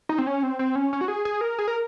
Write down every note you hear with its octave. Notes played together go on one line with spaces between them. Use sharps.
D#4
C4
C#4
C4
C4
C#4
C#4
F#4
G#4
G#4
A#4
G#4
A#4